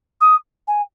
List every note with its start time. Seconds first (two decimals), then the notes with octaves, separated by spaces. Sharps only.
0.21 D#6
0.68 G#5